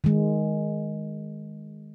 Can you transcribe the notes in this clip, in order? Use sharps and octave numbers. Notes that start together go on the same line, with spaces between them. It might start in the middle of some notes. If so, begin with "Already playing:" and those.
D#3 G#3